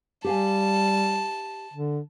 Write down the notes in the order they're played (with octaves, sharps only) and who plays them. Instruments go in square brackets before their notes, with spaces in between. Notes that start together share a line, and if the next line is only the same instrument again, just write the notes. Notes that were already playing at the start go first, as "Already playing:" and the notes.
[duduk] G3 [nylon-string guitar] G4 F5 G#5 [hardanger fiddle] A5
[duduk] D3